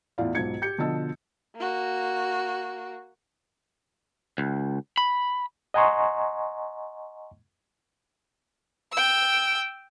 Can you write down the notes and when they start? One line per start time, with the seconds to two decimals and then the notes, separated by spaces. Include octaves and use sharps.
0.18 E2 A2 E4 F4 D5 F5
0.35 B1 G#2 D#4 F4 G#6 C#7
0.62 G4 G6 C#7
0.78 B2 D3 F3 D#5 A5 E6
1.56 A#3 F#4
4.38 C#2
4.98 B5
5.74 D#5 F#5 G#5 A#5 C6 C#6
8.92 G5 E6